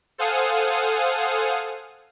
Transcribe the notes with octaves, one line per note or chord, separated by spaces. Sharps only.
A4 C5 F5 F#5 G#5 D#6